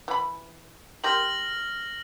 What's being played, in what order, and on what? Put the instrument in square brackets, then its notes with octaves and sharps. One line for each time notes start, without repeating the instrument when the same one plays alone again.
[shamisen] E3 B5
[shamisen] C4 G4 A#4 [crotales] F6 A#6 F#7